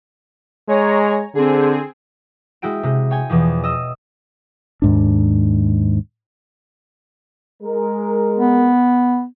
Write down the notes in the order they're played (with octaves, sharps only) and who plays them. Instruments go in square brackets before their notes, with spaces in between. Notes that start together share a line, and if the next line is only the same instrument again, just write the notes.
[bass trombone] G#3 [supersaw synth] C#5 G#5 A#5
[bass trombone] D3 [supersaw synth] C4 G#4
[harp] G#3 E4 F#4 G5 D7
C3 G#3
C#5 G5 G#5
E2 B2 E3 F3
D#5 E6
[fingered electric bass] D#2 G#2 D4
[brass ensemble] G#3 A#4
[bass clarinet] B3